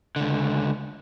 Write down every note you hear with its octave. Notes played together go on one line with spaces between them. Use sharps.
C#2 D3